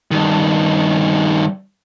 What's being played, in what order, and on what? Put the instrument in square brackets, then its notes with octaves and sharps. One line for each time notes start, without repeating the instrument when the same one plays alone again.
[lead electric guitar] G2 D#3